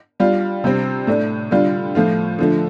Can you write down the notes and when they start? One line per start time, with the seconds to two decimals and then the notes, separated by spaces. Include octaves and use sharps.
0.20 G3 D4 F4
0.64 C3 G3 C4
1.07 A2 A3 D4
1.51 D3 G3 D4 F4
1.95 A2 F3 A3 F4
2.39 D3 F3 A3